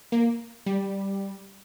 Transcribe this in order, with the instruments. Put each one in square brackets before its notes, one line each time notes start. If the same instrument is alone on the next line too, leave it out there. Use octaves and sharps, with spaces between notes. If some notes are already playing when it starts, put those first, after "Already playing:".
[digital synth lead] A#3
G3